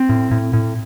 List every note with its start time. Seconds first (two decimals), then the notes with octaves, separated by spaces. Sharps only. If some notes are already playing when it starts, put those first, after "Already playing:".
Already playing: C4
0.09 A2
0.31 A2
0.53 A2